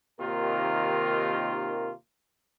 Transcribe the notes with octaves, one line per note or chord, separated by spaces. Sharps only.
D#2 C3 D#3 A#3 F4 A#4